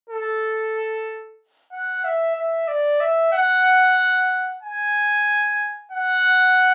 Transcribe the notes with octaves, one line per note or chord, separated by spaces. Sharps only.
A4
F#5
E5
E5
D5
E5
F#5
G#5
F#5